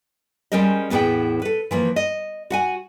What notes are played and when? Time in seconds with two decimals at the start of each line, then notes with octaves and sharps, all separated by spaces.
0.52 G3 G#3 C#4 A#4 C5 D#5
0.90 E2 A2 B3 E4 G#4 G5
1.42 A4 B4
1.71 E3 F3 A#3
1.96 D#5
2.50 F#4 F#5 G#5